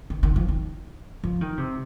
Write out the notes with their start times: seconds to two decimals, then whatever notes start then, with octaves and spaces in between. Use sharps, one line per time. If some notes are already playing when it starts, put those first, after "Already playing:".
0.10 D#3
0.23 D#3
0.36 F3
0.48 D#3
1.24 F3
1.41 D#3
1.58 C3